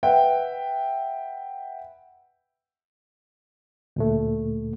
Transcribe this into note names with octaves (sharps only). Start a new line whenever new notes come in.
B4 E5 F#5 G5
D2 A#2 A3